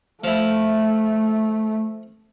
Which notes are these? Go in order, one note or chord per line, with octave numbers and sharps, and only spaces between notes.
F3 A3 E4